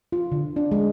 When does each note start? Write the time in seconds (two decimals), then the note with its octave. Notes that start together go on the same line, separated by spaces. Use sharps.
0.12 F4
0.32 D3
0.56 D4
0.72 G#3